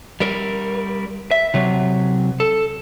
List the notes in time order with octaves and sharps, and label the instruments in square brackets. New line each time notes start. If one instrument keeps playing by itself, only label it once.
[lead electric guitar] G3 A#4
E5
C3 F#3
A4